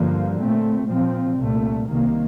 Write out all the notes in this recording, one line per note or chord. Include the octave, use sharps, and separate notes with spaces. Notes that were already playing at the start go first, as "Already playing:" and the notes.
Already playing: G2 D3 F3 A#3
A#2 A3 C4
A#2 F3 C4
C2 A#2 A3
C2 C3 D#3 A#3